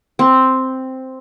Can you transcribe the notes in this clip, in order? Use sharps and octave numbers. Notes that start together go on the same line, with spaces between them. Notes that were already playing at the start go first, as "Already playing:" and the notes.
C4